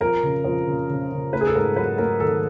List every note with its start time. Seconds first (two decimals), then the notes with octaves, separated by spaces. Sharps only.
0.01 F2 A#4
0.23 C#3
0.44 F2
0.67 C#3
0.89 C#3
1.12 C#3
1.33 A3 B4
1.41 G#4
1.47 A4
1.55 G#2 A#4
1.76 F#3 B4
1.98 A3 A#4
2.20 D#3 A4